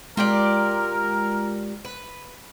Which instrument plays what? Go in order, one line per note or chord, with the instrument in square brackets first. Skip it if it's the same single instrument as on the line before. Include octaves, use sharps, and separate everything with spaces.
[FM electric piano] G#3 [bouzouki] F4 G4 D5 [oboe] A#4
[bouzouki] B4